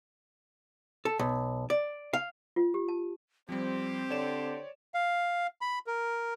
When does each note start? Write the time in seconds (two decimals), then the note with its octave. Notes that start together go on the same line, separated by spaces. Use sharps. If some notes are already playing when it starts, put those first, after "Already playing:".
1.05 A4
1.19 B1
1.70 D5
2.13 F5
2.56 F4
2.74 G4
2.88 A5
3.49 F3 G3 C4 G4 C5
4.10 D3 C#5 D5 E7
4.94 F5
5.61 B5
5.87 A#4